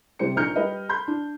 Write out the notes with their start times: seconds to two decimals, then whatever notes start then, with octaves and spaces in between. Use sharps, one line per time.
0.19 C3 G3 C5 C#7
0.36 A#1 D#4 A#5 F6 G6 C#7
0.56 G3 B4 D#5
0.89 B5 C6 G6
1.08 D4